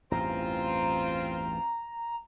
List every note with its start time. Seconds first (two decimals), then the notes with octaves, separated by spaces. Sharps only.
0.12 A1 E2 G2 C4 F4 A#5